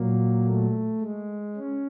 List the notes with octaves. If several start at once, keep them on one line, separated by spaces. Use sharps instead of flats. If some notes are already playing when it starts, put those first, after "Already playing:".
Already playing: A#2 F#3 A#3
A3
G#3
C#4